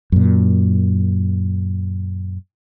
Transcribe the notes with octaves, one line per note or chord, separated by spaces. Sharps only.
F#2 A#2